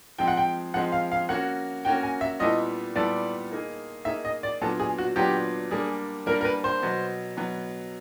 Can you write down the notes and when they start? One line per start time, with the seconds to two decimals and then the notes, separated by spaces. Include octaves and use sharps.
0.18 F3 G#3 C4 G5
0.28 F#5
0.37 G5
0.74 F3 G#3 C4 F#5
0.92 F5
1.12 F5
1.29 A#3 C#4 F#4 F#5
1.85 A#3 C#4 F#4 G5
2.03 G#5
2.21 E5
2.39 A#2 G3 B3 E4 A4 D#5
2.95 A#2 G3 B3 E4 A4 D5
3.51 A#3 D#4 G#4
4.05 A#3 D#4 G#4 E5
4.25 D#5
4.43 D5
4.61 A#2 F#3 B3 D4 A4
4.80 G#4
4.98 F#4
5.16 A#2 F#3 B3 D4 G4
5.71 G3 A#3 D4 G#4
6.26 G3 A#3 D4 A#4
6.41 A#4
6.45 B4
6.64 C5
6.83 B2 F#3 B3
7.37 B2 F#3 B3